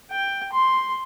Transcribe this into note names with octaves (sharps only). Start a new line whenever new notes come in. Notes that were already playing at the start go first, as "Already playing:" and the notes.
G5
C6